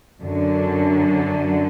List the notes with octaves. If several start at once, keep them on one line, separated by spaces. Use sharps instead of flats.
F#2 D3 F#3